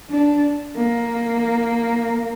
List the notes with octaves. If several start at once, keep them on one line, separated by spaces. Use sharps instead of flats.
D4
A#3